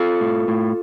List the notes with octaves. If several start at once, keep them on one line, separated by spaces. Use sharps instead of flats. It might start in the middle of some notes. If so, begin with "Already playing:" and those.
Already playing: F4 A4
A2
A2